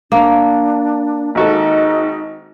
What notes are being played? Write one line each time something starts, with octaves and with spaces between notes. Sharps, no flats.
A#3 D4
G#1 D#4 F#4 A4